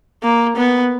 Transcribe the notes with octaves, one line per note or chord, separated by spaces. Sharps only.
A#3
B3